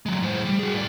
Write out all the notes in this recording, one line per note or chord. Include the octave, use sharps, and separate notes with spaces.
F#3 G#3
A2 C5
G3
F#4 G#4
A2 D5